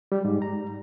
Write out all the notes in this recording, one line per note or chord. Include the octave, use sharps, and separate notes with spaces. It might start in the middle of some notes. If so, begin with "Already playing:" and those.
G3
G#2
A#5